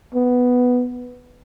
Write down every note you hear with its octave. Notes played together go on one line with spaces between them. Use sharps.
B3